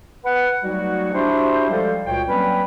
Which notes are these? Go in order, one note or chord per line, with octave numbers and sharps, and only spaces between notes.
B4 F#5
F#3 G3 A3 D#4 F#4
D4 E4 F#4 G4 C5
F3 G3 G#3 A4 C5 F5
C#2 A#2 F#4 C#5 G5
F#3 G3 A#3 C4 C#4 B4